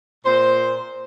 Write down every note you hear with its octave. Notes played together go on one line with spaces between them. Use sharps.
A#2 C5